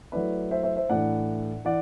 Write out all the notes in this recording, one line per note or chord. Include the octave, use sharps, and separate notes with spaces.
F#3 A3 E4 B4 D5
C5 E5
C5 E5
C5 E5
A2 E3 A3 D4 D5 F#5
E3 D5 F#5